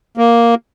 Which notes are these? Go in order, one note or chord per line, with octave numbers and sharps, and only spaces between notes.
A#3